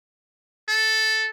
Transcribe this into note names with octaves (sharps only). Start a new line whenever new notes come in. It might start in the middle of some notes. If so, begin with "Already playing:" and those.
A4